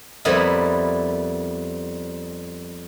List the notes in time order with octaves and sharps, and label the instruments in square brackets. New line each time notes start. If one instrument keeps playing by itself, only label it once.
[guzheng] F2 G3 B3 E4 A#4